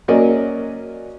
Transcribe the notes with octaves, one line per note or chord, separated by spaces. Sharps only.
F#3 A#3 C#4 D5 D#5